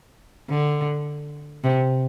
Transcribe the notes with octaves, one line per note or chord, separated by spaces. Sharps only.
D3
C3